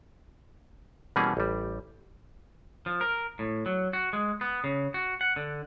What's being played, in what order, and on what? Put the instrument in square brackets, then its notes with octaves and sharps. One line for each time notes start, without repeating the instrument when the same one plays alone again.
[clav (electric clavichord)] B2 E3 G3 A#3 C#4 G#4
A1 G3
[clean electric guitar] F3
A#4
A2
F#3
F#4
G#3
B3
C#3
F#4
F#5
D3